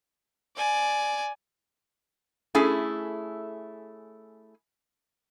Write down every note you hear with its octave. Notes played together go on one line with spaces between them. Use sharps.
D5 G#5
A3 C#4 E4 G#4 A4